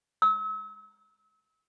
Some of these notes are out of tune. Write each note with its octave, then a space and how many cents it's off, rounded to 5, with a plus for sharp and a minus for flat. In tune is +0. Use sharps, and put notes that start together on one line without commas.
E6 -35